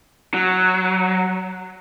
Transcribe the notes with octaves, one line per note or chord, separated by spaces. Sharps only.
F#3